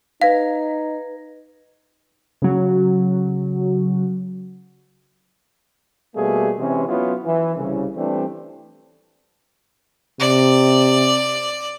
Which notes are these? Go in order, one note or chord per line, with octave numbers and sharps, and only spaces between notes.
D#4 B4 F5 G#6 A#6
C#3 F#3
B2 G3 A3 A#3 G#4
C3 E3 G#3 C4 C#4
F#3 B3 C#4 E4 F4
E3
C2 C#3
E3 G3 A3 C4 D4
C3 D5